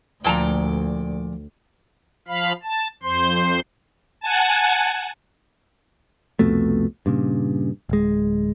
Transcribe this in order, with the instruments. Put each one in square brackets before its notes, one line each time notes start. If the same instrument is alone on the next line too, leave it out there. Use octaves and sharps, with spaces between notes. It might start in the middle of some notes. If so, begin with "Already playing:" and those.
[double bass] D2 [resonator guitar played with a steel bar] A#2 A5 A#5 [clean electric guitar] F3 D5 G5
[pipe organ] F3 F5 B5
A5
F2 C5 C6
[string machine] F#5 G#5 A5
[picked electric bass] C2 F2 B2 A3
G2 A#2 C#3
D1 G#3